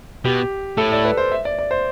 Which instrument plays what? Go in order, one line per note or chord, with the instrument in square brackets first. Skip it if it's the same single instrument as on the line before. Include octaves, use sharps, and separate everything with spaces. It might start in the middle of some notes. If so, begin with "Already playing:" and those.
[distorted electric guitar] B2 [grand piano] G4
[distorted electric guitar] A2 [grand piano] A4
[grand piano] D5
B4
C5
E5
D5
D5
C5